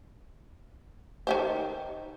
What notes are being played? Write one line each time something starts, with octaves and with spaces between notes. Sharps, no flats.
D#3 G4 C5